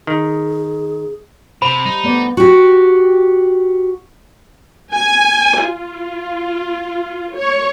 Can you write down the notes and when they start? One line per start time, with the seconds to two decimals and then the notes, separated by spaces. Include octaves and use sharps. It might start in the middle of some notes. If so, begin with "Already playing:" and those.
0.07 D#3 G#4
1.62 C3 C5 B5
1.85 G3 D#4
2.04 A3 B3 D5
2.37 F#4 G4
4.93 G#5
5.65 F4
7.35 C#5